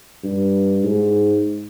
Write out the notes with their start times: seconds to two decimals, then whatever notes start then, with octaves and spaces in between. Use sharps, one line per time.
0.23 G2
0.83 G#2